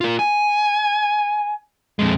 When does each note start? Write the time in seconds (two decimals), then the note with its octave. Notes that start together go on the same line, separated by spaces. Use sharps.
0.01 F4 A#4
0.19 G#5
1.99 F2 G#3